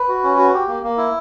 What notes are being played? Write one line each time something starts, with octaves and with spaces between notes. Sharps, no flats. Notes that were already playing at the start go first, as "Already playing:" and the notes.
Already playing: B4
F#4
C#4
F#4
G4
A#3
A#3
E4